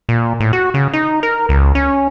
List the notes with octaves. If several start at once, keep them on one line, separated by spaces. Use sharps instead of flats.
A#2
A2
F#4
C#3
D#4
A#4
C#2
C#4